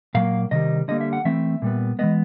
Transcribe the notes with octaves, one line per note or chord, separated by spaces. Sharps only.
A#2 F#3 A#3 F5
C3 D#3 G3 D#5
D3 G3 A#3 D#5
E5
F#5
E3 A3 C4 E5
A#2 G3 B3
E3 G#3 B3 D#5